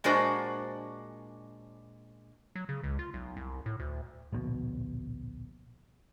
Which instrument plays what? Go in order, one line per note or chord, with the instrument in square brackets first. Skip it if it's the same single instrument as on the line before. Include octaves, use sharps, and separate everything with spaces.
[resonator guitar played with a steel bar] A#2 G#3 D4 F#4 C5
[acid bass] F#3
C#3
C#2
F4
B1
C2
A2
D2
[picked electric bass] D1 A#1 B2